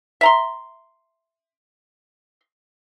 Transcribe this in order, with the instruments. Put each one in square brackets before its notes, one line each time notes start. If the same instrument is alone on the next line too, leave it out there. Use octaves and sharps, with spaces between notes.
[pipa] E5 A#5 C6